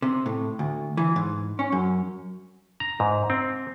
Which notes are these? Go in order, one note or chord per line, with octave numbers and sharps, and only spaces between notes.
C3
A2
D2
E3
G#2
C#4
F#2
A#5
G#2
C4